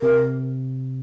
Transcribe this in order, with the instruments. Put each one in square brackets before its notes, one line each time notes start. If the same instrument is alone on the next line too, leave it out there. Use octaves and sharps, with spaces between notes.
[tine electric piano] C3 [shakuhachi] A#4